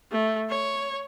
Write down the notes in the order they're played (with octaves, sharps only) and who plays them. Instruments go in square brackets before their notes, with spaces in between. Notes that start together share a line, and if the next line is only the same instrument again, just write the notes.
[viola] A3
C#5